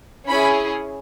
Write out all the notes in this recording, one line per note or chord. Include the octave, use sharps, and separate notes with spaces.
C#4 E4 G#4 B5